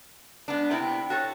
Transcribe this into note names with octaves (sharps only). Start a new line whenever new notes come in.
G#3 B3 D4
C3 B3 C4 E4 G5
F#4 A4 C#5